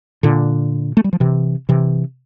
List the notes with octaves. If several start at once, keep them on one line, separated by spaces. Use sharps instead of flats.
A#2 D3
A3
G3
F3
C3 E3
C3 E3